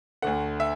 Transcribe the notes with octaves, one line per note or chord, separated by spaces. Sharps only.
D2 D3 A3 F#5
E5